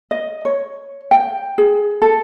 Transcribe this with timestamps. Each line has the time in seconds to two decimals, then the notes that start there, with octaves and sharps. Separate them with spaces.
0.11 D#5
0.45 C#5
1.11 G5
1.58 G#4
2.02 A4